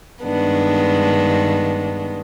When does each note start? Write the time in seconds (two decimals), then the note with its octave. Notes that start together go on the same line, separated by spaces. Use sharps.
0.24 G2 D#3 G#3 B3 D4